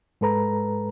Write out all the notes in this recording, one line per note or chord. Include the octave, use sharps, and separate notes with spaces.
G#2 G#3 A4 B4 A#5